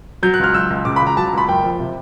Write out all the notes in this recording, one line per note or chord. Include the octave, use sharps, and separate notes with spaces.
F#3 G6
F#6
C#2 F6
C#2 E6
C#2
C#3 D6
B5
C#2 A#5
F#3 A5
A#5
C#2 B5
F#1 G5
F3
C3